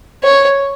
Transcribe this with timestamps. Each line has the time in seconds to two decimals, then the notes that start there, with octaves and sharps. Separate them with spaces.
0.23 C#5